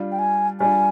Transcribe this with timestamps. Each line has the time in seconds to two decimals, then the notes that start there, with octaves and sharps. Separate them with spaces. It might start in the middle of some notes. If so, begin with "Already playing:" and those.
Already playing: G3 D4 F4
0.12 G5
0.19 G#5
0.60 G3 D4 F4 G#5